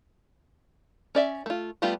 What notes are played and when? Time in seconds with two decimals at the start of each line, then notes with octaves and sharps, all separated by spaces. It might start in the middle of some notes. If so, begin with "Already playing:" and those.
1.15 C#4 D5 E5
1.46 A3 F4
1.82 G3 A3 B3 F4 G4